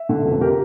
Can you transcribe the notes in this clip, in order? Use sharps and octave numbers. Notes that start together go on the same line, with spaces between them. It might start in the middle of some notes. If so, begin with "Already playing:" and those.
Already playing: E5
D3
F1
G4 A#4